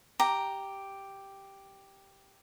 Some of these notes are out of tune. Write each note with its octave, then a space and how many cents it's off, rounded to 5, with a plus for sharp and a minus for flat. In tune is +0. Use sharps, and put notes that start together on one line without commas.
G4 +0 A#5 +0